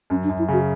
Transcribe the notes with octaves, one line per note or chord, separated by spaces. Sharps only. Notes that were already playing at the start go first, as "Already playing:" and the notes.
F#2 C#4
D4
F#2
E4
C#3 F#4